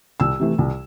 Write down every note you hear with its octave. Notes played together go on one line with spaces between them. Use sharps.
C2 E6
C3 E3 A3
C2